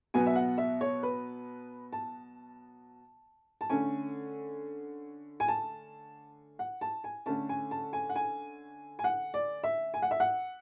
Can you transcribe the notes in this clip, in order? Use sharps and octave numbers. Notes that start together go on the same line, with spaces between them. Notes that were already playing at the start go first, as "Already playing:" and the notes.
B2 F#3 B3 G#5
E5
F#5
E5
C#5
B4
A5
A5
D3 A3 C#4 G#5
G#5
A5
F#5
A5
G#5
D3 A3 C#4 A5
G#5
A5
G#5
F#5
G#5
G#5
F#5
D5
E5
G#5
F#5
E5
F#5